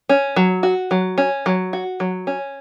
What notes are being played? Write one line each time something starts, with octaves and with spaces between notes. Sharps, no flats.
C#4
F#3
F#4
F#3
C#4
F#3
F#4
F#3
C#4